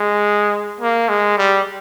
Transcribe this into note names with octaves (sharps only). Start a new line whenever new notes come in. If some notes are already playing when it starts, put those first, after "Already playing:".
Already playing: G#3
A#3
G#3
G3